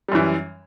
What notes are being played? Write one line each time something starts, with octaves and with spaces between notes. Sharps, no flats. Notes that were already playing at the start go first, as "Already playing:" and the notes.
F#2 E3 G3